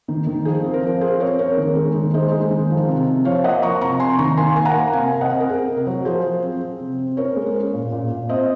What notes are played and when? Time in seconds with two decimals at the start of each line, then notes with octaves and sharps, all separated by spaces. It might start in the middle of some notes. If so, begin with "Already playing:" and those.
0.08 D#3
0.27 D#3
0.45 F3 G#4
0.64 C4
0.74 A#4
0.83 F3
1.01 C4 G#4 C5
1.20 C4 A#4 C#5
1.38 C4 A#4 C#5
1.57 D#3
1.76 G#3
1.95 D#3
2.14 G#3 C5 D#5
2.32 G#3
2.51 D#3
2.70 F3
2.88 C3
3.07 C3
3.25 F3 C#5 F5
3.44 A#3 D#5 F#5
3.62 F3 A#5 C#6
3.81 C3 A#5 C#6
3.99 C3 G#5 C6
4.19 D#3 A#5 C#6
4.37 A#3 G#5 C6
4.56 A#3 G#5
4.65 F#5 A#5
4.74 A#3
4.93 C3 F5 G#5
5.12 C3
5.21 D#5 F#5
5.31 C4
5.40 A#4
5.49 C4 G#4
5.68 C3
5.77 A#4
5.87 F#3
6.05 F3 G#4 C5
6.24 F3
6.42 C4
6.61 C4
6.80 C3
6.98 C4
7.17 C#4 A#4 C#5
7.36 G#3
7.54 C#4
7.73 A#2
7.92 A#2
8.10 A#2
8.29 C4 C5 D#5